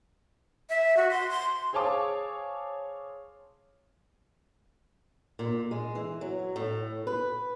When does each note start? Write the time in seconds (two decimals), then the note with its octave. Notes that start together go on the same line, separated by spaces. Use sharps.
0.70 E5
0.97 F#4
1.11 C6
1.31 C6
1.73 G#4 C5 C#5 F5 A5 D6
5.39 A#2
5.71 G#3
5.95 E3
6.21 F#3
6.56 A2
7.07 B4